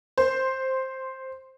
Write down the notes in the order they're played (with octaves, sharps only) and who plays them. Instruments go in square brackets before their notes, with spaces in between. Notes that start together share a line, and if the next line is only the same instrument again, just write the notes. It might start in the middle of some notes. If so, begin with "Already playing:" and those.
[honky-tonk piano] C5